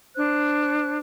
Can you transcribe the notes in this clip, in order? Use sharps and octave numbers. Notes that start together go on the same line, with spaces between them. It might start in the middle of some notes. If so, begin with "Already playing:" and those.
D4 C5 F#6